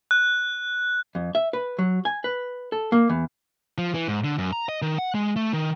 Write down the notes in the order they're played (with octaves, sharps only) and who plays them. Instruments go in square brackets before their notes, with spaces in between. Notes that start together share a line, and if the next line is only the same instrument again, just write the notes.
[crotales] F#6
[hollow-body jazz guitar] F2
E5
B4
F#3
G#5
B4
A4
A#3
E2
[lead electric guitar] F3
E3
G#2
D3
F#2
A#5
D#5
D#3
F#5
G#3
A3
D#3